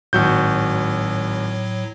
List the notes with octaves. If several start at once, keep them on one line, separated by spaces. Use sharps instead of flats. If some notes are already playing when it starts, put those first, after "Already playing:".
G#1 A2 F#3 F#4 G6